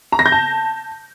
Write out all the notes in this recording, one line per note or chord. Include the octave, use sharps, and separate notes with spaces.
A#5
A#6
G6
A5